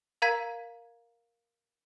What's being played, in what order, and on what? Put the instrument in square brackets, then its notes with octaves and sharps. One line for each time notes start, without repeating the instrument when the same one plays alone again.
[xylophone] A#4 F5 A#5 G#6 B6